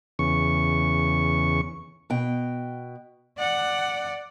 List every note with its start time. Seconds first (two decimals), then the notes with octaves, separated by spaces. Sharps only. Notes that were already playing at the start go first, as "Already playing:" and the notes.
0.19 E2 C#3 C#6
2.10 B2 G5
3.38 D5 F#5